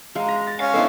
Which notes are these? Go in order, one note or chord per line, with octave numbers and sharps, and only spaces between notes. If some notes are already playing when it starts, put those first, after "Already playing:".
G#3 F5 A#5
A#5 A#6
A6
C#4 F5
A3 B3 D4 E4 C5 D#5